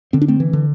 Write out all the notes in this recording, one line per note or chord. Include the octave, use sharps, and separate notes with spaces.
D3 C4
D4
A3 C4
E3
D3